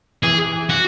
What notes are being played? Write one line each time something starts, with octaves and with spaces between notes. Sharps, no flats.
E3 G#4
F#4